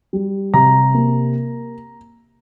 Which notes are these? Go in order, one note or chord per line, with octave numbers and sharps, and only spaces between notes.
G3
C3 A#5
A#3